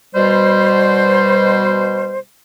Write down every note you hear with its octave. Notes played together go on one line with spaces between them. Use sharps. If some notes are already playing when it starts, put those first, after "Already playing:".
B2 G3 C5